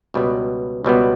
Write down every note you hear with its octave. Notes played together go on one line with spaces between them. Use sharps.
C#2 B2 G3 B3
C#2 B2 G3 B3